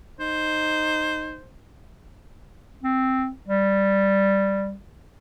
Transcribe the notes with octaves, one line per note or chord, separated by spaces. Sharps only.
D#4 C5
C4
G3